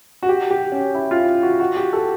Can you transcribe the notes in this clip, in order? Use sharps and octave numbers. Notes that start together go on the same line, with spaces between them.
F#4
G4
G4
C#4
E4
F4
F#4
F#4
G4
A4